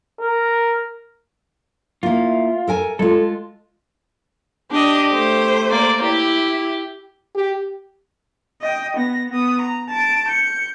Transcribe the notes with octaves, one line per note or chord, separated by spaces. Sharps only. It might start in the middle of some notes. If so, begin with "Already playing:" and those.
A#4
A#3 E4 F4
A4 A#4 G#5
G#3 F4 A4
D4 G4 D#5
A3 C5
A#3 D5
E4 G4
G4
D#5 G5
B3 A#6
B3 D#6
A#5
A5 D7
G6 C#7